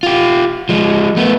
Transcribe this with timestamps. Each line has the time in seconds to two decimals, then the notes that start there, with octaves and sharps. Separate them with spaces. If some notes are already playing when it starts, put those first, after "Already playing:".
0.03 F4 G4
0.69 F3 G#3
1.17 A3 B3